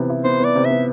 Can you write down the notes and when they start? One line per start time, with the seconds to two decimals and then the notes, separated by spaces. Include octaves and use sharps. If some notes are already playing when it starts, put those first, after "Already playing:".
Already playing: C3 E3 B3
0.10 E4
0.24 B3 C5
0.40 B3 D5
0.55 C3
0.65 E5
0.71 B3